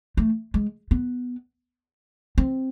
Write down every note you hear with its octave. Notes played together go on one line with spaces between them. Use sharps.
A3
G#3
B3
C4